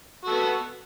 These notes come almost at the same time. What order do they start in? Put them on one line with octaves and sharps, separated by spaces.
F#4 A4 B3